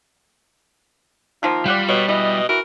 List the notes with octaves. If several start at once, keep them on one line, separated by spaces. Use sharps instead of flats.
D#3 F3 A#3 F4
G3 D5 F#5 G5
B2 C#5
B2 E3 D#5
E3 F#4 A#4